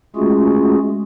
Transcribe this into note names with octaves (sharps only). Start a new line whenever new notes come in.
G#3 A3 C#4 F4 F#4 G#4